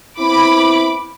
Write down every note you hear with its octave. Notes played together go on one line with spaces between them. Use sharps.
B3 C4 E4 B5 D6